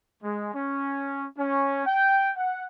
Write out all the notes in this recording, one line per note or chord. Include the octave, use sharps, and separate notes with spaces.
G#3
C#4
C#4
G5
F#5